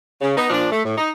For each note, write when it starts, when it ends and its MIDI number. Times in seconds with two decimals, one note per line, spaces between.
0.22 0.35 49
0.37 0.47 59
0.37 0.47 63
0.49 0.69 46
0.49 0.69 53
0.49 0.69 62
0.72 0.81 57
0.85 0.95 45
0.97 1.11 63